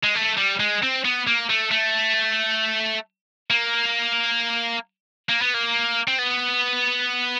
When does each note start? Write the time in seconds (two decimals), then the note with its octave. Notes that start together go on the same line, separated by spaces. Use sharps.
0.03 G#3
0.15 A3
0.38 G3
0.60 G#3
0.83 C4
1.05 B3
1.27 A#3
1.50 A3
1.71 A3
3.50 A#3
5.29 A#3
5.42 B3
5.54 A#3
6.08 C4
6.19 B3